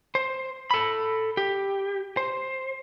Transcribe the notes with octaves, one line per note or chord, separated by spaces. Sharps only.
C5
A4 B5
G4
C5